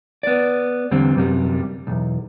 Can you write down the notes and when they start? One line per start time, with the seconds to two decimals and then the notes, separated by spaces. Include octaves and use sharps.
0.23 B3 D5
0.91 E2 D3 G3 C4
1.16 F#2 C3 G3
1.87 B1 E2